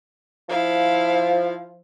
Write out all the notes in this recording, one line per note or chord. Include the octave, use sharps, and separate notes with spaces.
F3 E4 F5